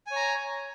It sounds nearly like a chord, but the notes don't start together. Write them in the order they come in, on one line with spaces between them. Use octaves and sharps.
G#5 C#5 A#5